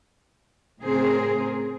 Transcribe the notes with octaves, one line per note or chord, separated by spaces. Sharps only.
A2 C#3 C4 G#4 A#4 C5